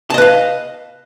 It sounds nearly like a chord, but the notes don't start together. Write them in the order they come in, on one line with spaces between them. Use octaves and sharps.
A5 D#5 B4 F5